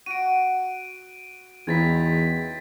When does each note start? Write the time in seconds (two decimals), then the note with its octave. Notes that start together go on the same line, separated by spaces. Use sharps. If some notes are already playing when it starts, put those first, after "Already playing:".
0.06 F#4 D7 D#7
1.67 E2 C#3 C4 D#4 G#6 A6 B6